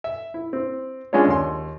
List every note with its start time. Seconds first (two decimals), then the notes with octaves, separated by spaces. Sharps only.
0.04 E5
0.34 E4
0.53 C4
1.13 G#3 C#4 D4 F4 C#5
1.27 D#2 C6